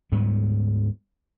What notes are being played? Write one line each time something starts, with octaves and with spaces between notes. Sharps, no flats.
D2 G#2 G3 B3